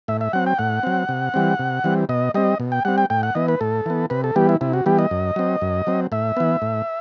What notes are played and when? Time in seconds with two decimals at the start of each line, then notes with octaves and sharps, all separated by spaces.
0.08 A2 E5
0.21 E5
0.33 F#3 C4 F#5
0.46 G5
0.59 A2 F#5
0.83 F#3 C4
1.09 C3
1.34 E3 G3 C4
1.59 C3
1.84 E3 G3 C4
2.09 B2 D#5
2.34 G3 C4 D#5
2.60 B2
2.72 G5
2.85 G3 C4 F#5
2.98 G5
3.10 A2 G5
3.23 F#5
3.35 E3 B3 D#5
3.48 B4
3.61 A2 A4
3.86 E3 B3
4.10 C3 B4
4.24 A4
4.36 E3 G3 B3 G4
4.49 E4
4.61 C3 E4
4.73 F#4
4.86 E3 G3 B3 G4
4.99 D#5
5.11 F#2
5.36 F#3 C4
5.62 F#2
5.87 F#3 C4
6.12 A2 E5
6.37 E3 B3
6.62 A2